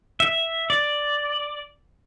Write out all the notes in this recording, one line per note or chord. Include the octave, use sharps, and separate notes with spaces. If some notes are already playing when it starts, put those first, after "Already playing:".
E5
D5